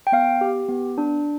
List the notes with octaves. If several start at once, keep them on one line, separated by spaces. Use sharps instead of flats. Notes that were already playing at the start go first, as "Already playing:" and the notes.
G5
B3 F5
G4
B3
D4